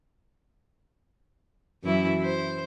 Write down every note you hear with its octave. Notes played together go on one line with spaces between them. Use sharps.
F#2 E3 E4
C5